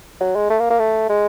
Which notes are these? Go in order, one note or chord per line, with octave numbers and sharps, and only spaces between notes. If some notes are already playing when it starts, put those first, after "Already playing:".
F#3
G#3
A3
A#3
A#3
A3
G#3